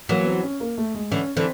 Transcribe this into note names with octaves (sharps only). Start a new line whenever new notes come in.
E3 F#3 A#3
B3
C4
C#4
A#3
A3
G#3
D3 E3 C#4
D3 E3 C4